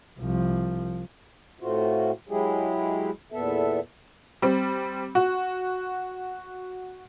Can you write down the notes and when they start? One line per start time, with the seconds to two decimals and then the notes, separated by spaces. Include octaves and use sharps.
0.19 C2 F3
1.61 A2 A3 C4 F4 F#4
2.29 F#3 G#3 E4 G4 G#4
3.32 E2 A#2 B3 A4 E5
4.42 G3 C4
5.15 F#4